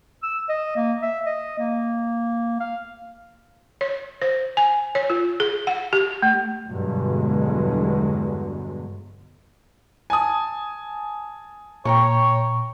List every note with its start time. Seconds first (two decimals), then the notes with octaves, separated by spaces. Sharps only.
0.23 E6
0.49 D#5
0.76 A#3
1.02 E5
1.26 D#5
1.59 A#3
2.60 F5
3.81 C#5
4.22 C5
4.57 G#5
4.95 C#5
5.10 F4
5.40 G#4
5.67 F#5
5.93 G4
6.22 A3
6.68 E2 G2 B2 D3 F#3 G#3
10.10 G#5 A5 D#6
11.85 A#2 C#5 G5 A#5 C#6